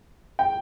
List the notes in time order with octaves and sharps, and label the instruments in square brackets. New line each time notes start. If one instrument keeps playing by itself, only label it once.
[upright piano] G5